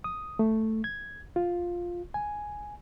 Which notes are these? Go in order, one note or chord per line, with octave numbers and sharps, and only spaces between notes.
D#6
A3
G#6
F4
G#5